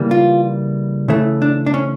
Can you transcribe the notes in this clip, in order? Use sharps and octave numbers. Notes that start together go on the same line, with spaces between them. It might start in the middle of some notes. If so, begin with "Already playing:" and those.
Already playing: C#3 E3 G3 A#3
F4
C#3 E3 A3 E4
D4
D4
C#4